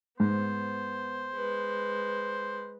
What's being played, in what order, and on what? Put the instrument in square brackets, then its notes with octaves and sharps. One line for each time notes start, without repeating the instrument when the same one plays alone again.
[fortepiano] G#2 [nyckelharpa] B3 [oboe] C5
[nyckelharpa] G#3 B4